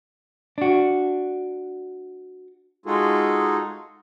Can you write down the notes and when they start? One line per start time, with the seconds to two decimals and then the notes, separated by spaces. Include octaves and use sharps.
0.58 D4 F#4
2.86 G#3 D#4 F4 F#4 G#4 A4